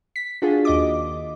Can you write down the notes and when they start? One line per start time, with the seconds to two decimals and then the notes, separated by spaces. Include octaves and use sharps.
0.16 B6
0.42 D4 F4 F#4 G#4
0.65 D#2 D#5 D6